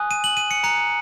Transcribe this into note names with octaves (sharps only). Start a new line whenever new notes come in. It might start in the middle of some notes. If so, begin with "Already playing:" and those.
Already playing: G#5 D#6 F#6
D#7
F#7
D#7
C#7
A#5 F#6 C#7